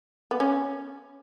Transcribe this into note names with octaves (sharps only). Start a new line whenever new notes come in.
B3
C#4